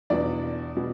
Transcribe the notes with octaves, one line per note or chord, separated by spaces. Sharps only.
E2 B2 D4 D5
B2